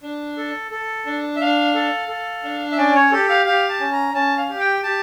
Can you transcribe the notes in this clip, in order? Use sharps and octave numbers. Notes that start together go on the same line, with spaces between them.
D4
A4
A4
D4
E5
D4 F5
A4
A4
D4
E5
C#4 D5
C#5
G4 A4
F5
G4 F5
A5
C#4
A#5
C#4 A5
F5
G4
G5
G4 A5